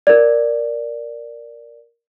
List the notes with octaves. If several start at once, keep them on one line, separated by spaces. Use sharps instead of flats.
A#4 D5